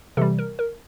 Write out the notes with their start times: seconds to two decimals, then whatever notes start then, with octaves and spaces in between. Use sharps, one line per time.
0.17 C3 E3 G3 A4
0.38 A#4
0.59 A#4